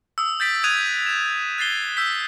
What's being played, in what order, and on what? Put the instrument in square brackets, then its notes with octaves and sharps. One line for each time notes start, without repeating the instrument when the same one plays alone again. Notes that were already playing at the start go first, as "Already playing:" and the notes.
[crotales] D#6 E6
G6 A6 B6 D7
D#6 E6 F#6 G#6 D#7 F7
F#6 E7
F#6 A6 C7 G7
E6 G6 B6